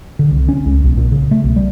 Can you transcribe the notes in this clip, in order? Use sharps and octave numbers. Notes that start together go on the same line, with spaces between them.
D3
C2
C#4
C#2
B1
A#2
C#3
A3
B1
G3